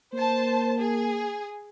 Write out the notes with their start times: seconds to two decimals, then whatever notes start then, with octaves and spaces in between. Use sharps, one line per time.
0.13 A#3 C5 A5
0.78 G#4